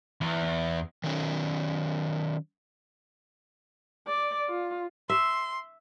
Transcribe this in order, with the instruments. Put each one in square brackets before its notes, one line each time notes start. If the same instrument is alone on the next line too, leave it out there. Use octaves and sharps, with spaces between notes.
[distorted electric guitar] E2
[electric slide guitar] D#3 F#3 C#4
[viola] D5
F4
[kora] E5 [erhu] C6